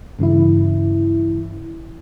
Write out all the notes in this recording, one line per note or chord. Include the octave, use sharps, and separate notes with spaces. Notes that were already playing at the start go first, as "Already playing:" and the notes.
G2 C#3 E3 E4